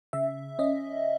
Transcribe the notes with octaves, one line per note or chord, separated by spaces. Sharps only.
C#3 E5
C#4 D#5